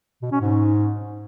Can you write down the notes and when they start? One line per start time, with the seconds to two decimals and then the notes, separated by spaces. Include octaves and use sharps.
0.22 B2
0.32 C#4
0.41 G#2